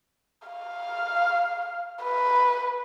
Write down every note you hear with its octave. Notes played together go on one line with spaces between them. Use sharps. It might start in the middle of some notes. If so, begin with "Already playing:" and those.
F5
B4